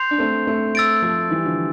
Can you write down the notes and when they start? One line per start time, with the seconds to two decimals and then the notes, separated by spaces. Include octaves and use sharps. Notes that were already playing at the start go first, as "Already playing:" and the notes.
Already playing: C6 G6 C7 F7
0.11 D4
0.18 A3 C4
0.47 A3 C4
0.75 E6 A6 D7
1.02 F3 A3
1.31 E3 G3
1.45 D3 F3